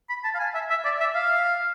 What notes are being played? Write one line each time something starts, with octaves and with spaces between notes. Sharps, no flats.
B5
A5
F5
G#5
E5
E5
D5
E5
F5